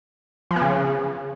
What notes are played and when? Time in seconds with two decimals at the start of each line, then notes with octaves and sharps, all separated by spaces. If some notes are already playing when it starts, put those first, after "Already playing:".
0.51 F3
0.56 B3
0.61 C#3